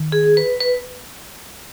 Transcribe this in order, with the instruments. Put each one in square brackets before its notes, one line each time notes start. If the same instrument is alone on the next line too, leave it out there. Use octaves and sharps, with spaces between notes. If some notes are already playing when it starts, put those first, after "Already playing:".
Already playing: [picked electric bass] D#3
[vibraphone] G#4
B4
B4